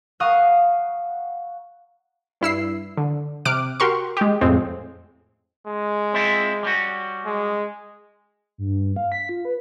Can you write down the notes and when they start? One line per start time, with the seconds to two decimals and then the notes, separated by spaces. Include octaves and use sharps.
0.20 F5 F#5 A#5 C#6 D#6
2.41 G2 E4 E6 C7
2.97 D3
3.45 C3 D6 F6 F#6 D7
3.80 F#4 G4 A#4 C6 C#6
4.17 G#3 G4
4.41 F2 A2 G#3 C4
5.67 G#3
6.14 C4 E4 F4
6.63 G3 C#4 F#4
7.26 G#3
8.58 G2
8.96 F5
9.12 B6
9.29 F4
9.45 B4